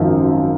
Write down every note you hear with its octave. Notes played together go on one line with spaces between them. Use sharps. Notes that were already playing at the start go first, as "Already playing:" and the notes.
Already playing: G#1 F#2 F3